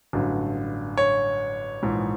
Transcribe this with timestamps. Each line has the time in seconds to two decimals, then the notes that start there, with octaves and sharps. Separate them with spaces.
0.13 A1 G2 D3 F#3
0.97 C#5
1.83 A#1 G#2 E3